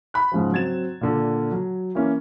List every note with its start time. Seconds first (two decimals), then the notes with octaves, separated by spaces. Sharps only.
0.14 B5 F#6
0.32 G#2 C#3 F3
0.52 F#3 C4 G#6 A6 E7
1.01 A#2 D3
1.52 F#3
1.95 E3 A#3 C#4